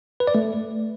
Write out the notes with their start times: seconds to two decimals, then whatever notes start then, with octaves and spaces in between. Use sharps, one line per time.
0.20 B4
0.27 D5
0.35 A3